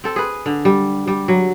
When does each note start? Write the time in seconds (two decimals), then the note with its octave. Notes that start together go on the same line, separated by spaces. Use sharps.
0.04 C4 A4
0.16 G#4 B4
0.46 D3
0.65 G3
1.07 G3
1.28 F#3